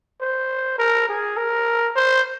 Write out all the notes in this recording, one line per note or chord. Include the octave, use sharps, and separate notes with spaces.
C5
A#4
G#4
A#4
C5